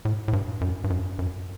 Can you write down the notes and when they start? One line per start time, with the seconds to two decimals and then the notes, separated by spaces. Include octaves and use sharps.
0.05 A2
0.28 A2
0.33 G2
0.61 F#2
0.84 G2
0.90 F#2
1.19 F#2